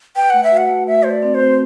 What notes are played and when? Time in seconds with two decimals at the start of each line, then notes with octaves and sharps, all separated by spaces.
0.16 B4 G5
0.30 A3 F#5
0.44 E5
0.51 F#4
0.57 F#5
0.69 A3
0.87 A3 E5
1.03 A3 C5
1.10 D5
1.22 C4
1.34 C5
1.40 C4